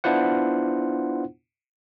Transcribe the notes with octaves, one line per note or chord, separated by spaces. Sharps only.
B3 D4 E4 F4 C5 F#5